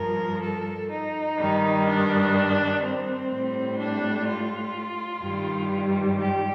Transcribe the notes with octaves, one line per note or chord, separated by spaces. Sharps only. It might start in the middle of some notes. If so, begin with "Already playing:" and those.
Already playing: G2 F3 A#4
A4
D#4
G2 D#3 G3
D4
C4
A2 G3
D4
F4
G2 D#3 G3
G4